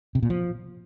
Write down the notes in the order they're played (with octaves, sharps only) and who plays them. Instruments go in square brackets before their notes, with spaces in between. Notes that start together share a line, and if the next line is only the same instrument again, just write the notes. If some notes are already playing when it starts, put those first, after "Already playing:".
[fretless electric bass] C3
A#2
F3